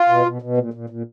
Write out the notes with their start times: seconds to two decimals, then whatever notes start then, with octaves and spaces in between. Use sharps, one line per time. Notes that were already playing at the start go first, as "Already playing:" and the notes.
Already playing: F4
0.09 B2
0.26 B2
0.42 B2
0.57 A#2
0.74 A#2
0.90 A#2